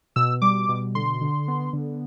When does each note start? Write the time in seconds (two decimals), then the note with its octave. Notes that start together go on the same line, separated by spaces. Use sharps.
0.16 B2 E6
0.42 G3 D6
0.69 B2
0.95 D3 C6
1.21 D3
1.48 B3
1.73 D3